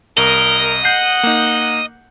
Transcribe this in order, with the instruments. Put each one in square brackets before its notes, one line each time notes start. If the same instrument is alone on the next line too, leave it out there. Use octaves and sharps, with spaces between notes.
[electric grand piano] C2 [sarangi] A#4 [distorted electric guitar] D#5
[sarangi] F#5 [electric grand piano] G6 C7
[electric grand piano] A#3 D#4